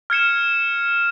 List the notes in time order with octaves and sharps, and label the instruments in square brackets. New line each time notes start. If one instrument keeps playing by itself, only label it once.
[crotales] F6 G#6 C#7 E7